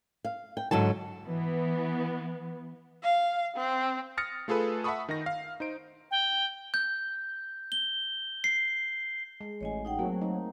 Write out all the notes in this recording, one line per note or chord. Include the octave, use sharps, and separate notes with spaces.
F5
G5
G#2 D3 F#3 A5
E3 B3
F5
C4
D#6 F6 A6 A#6 C#7
A3 F4 G#4 A4 B4
E5 F#5 A5 B5 C#6 D#6
D#3 D#4 A#6
F5
D#4 C5 D7
G5
G6
G7
C7
G#3
A1 C#5 D#5 G#5
D#4 F#5 G5
F#3 A3 A#3 C4
D#4